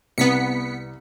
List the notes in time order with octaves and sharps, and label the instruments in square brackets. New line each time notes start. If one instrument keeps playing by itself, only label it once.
[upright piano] C2 [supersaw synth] B3 B6 C#7